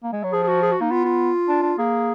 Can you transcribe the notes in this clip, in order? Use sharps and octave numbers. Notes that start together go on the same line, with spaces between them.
A#3
G#3
F#3
F3 G#4
G#4
F#4
G#4
F#4
A#3 D#4
B3 F4
F4
D4
D4
A#3 G#4